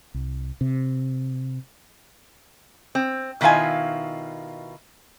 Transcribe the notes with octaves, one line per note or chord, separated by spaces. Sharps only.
C2
C3
C4
B2 D#3 E4 F4 F5 G#5